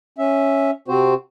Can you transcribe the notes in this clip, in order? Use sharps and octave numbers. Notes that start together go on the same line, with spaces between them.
C#4 E5
C3 C4 F#4 C5